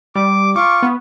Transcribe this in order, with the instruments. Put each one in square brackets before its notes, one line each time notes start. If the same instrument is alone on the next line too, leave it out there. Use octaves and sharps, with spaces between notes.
[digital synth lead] G3 [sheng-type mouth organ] D6
[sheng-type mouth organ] F4 C#6 [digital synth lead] D6
[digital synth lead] B3